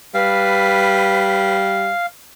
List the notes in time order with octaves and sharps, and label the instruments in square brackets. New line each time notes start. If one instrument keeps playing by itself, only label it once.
[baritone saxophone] G3 [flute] B4 [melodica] F5